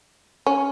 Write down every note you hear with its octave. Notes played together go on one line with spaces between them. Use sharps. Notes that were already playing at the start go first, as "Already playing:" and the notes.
C#4